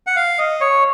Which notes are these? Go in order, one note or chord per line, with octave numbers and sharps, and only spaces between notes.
F#5
F5
D#5
C#5